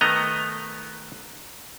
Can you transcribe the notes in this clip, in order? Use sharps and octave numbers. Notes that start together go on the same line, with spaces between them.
D#3 A3 B3 D#5 A#5